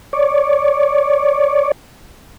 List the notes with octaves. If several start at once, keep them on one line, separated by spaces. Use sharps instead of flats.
C#5 D5